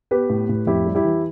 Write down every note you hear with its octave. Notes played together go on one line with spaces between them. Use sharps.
B3 G4 B4
A2
A2
F2 E4 G4
G3
E4 G4
E3